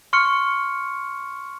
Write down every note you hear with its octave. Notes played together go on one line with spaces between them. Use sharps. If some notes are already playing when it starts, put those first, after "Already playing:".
C6 C#6 F6 C#7